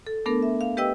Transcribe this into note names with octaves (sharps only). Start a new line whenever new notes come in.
A4
A3 B3 D4 A4 A#4
E5
F5
G4 B4 D#5 G5 E6